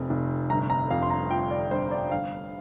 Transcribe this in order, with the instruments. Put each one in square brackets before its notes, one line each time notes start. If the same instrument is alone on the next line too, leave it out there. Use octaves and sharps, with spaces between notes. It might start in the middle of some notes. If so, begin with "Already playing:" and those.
Already playing: [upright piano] F1 F2 C3
F1
G1 A#5
A#5
F2 F5
C6
A#5
F3 G5
D5
G1 C5
D5
G1 F5